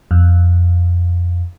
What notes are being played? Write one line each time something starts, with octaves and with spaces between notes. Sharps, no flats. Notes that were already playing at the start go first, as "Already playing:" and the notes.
F2